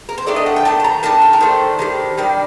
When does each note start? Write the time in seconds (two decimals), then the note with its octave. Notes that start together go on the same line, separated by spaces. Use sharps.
0.09 A#4
0.18 C5
0.26 D#3 A3 D4 D5
0.36 D#5
0.46 F#5
0.56 G5
0.65 D#3 A3 D4 A5
0.80 A5
0.84 A#5
1.03 D#3 A3 D4 A5
1.22 G5
1.33 A#4
1.41 D#3 A3 D4 C5
1.79 D#3 G3 D4
2.18 D#3 G3 D4 D5